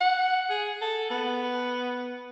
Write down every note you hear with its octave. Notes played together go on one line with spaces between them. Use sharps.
F#5
G#4
A4
B3